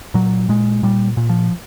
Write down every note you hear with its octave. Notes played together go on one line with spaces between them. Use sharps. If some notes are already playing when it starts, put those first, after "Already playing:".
A#2 F#3
A#2 G#3
A#2 G3
A#2
F3